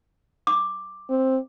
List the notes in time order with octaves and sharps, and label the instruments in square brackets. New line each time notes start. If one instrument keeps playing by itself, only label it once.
[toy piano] D6
[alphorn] C4